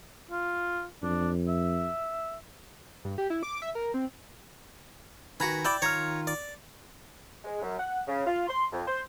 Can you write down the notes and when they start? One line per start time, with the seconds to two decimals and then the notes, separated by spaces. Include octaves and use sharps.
0.31 F4
1.03 F2 D4
1.48 E5
3.04 G2
3.18 G4
3.30 E4
3.43 D6
3.62 E5
3.75 A#4
3.94 C4
5.40 D#3 F#4 B4 G#5 A#5 B5
5.65 E4 D5 G5 B5 D6
5.82 D#3 F4 C#5 A#5 F6
6.27 D5
7.44 G#3
7.62 F#2
7.78 F#5
8.08 C#3
8.27 F4
8.48 C6
8.72 F2
8.86 C5